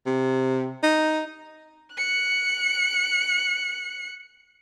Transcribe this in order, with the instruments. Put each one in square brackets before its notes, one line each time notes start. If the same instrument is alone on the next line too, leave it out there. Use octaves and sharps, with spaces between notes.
[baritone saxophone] C3
D#4
[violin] F#6 C#7